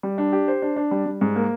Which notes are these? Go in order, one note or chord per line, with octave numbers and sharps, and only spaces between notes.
G3
D4
G4
C5
D4
D4
G3
G3
G#2
A#3